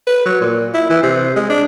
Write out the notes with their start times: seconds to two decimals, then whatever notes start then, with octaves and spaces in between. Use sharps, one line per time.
0.07 B4
0.26 F#3
0.41 A#2
0.74 E4
0.90 E3
1.03 C3
1.36 G#3
1.49 D4